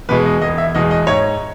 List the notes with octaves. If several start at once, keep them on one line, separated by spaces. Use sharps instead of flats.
E2 B2 G#3 B4
D#5
E1 D#5
E5
E2 B2 G#3 D#5
D#5
G#2 C#5